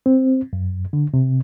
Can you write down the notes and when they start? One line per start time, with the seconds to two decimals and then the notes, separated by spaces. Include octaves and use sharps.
0.06 C4
0.53 F#2
0.93 D3
1.14 C3